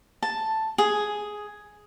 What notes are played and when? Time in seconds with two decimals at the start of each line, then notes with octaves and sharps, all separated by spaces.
0.23 A5
0.78 G#4